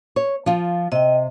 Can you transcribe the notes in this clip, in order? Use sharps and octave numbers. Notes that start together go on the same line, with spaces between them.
C#5
F3 F4
C3 D#5 G5